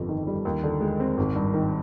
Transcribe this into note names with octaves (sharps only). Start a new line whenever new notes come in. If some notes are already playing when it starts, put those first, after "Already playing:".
Already playing: G1 F2 G3
D#3
G3
D#2
D3
G#3
C4
G#1
G2
D#3